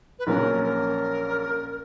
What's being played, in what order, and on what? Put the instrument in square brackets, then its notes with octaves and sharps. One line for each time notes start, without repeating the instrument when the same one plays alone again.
[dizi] B4
[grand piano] A#1 A#2 F#3 C#4 [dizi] A#4
[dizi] A#4